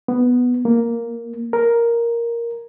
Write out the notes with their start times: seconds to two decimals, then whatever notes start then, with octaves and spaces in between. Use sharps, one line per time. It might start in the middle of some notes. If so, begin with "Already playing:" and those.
0.08 B3
0.65 A#3
1.53 A#4